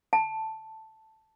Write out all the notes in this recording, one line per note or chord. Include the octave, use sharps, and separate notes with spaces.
A5